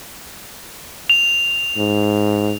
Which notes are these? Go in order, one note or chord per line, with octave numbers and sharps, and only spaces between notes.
F7
G#2